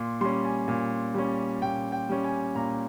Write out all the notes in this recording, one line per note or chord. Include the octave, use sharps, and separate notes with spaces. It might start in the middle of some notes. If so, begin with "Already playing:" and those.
Already playing: A#2 C6
G3 C#4 C6
G#5
A#2
G3 C#4
A#2 G5
G5
G3 C#4
G#5
A#2 A#5